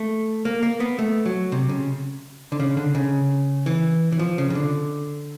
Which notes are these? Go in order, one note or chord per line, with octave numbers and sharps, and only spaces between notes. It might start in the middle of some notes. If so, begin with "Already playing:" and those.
Already playing: A3
A#3
A#3
B3
A3
F#3
C3
C#3
D3
C#3
D3
C#3
E3
E3
F3
C#3
C#3
D3